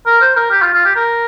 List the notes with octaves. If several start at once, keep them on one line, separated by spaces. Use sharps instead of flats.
A#4
C5
A#4
G4
F4
F4
G4
A#4